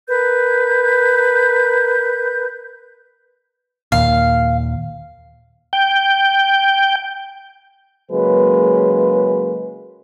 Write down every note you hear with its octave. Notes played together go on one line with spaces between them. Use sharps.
A#4 B4 G6
D#2 A#2 F5
G5
C#3 F#3 G#3 A#3 B4